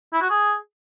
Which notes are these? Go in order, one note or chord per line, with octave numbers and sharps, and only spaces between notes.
E4
F#4
G#4